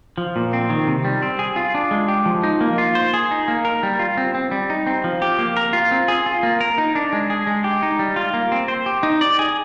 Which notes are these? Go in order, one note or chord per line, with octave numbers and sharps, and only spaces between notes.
F3
A#2
C4
D#3
C3
G3
C4
G#4
F4
D4
G#3
G4
F3
D#4
A#3
F4
C5
G#4
D#4
A#3
A#4
G3
F4
C4
C4
G3
D#4
C4
F3
G4
A#3
A#4
F4
C4
G#4
F4
A#3
A#4
D#4
D4
G#3
G#4
G#3
G4
D#4
G3
F4
A#3
C4
C5
G4
D#4
D5
G#4